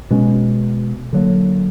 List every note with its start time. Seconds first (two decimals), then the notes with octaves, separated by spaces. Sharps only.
0.11 B2 G#3 C#4
1.13 D3 F#3 A#3